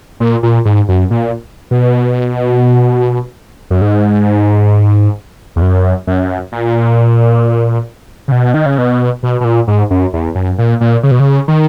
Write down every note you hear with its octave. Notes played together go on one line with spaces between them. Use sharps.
A#2
A#2
G#2
F#2
A#2
B2
F#2
G#2
E2
F#2
F#2
A#2
C#3
B2
D#3
C#3
B2
B2
B2
A#2
G#2
F#2
E2
F#2
A#2
A#2
C#3
B2
C#3
D#3